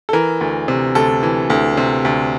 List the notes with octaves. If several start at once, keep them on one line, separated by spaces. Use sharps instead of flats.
A4
E3 A#4
D2
C3
D2 A4
E3
D2
C3
D2